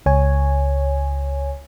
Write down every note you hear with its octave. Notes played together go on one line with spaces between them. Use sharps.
C#2 C#5 G#5